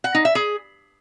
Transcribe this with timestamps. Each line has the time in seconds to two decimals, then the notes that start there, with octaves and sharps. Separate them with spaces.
0.04 F#5
0.15 D#4
0.25 E5
0.35 G#4